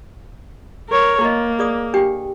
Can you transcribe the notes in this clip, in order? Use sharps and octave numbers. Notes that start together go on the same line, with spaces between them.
A#4 C#5
A#3 E4 D#5
G#4 D5 D#6
D4 G4 G5